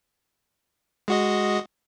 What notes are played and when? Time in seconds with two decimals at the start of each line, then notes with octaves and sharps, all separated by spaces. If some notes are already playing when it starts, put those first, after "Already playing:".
1.08 G#3 F#4 D#5